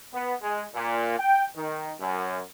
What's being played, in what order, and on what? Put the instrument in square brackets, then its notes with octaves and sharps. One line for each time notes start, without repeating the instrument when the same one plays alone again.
[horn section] B3
G#3
A#2
G5
D#3
F#2